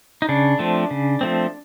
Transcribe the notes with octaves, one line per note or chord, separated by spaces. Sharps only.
D#4
C#3 D4
F3 A3 C4
C#3
F3 A3 C4